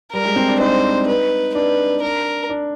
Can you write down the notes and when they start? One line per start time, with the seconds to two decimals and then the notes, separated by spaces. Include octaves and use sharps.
0.13 G3 A#4
0.24 G#3
0.36 C4
0.48 D4
0.60 D#4 C5
1.08 B4
1.55 D4 B4
2.03 A#4
2.50 D4